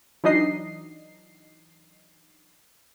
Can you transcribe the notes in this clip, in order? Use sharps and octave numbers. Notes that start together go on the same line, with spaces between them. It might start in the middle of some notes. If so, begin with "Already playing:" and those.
E3 F#3 D4 D#4 D#5 C7